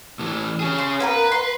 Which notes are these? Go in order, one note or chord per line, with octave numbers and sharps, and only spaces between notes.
A2 E3
C#4 G#4
C6
A#3 B3 A#4 B4
C6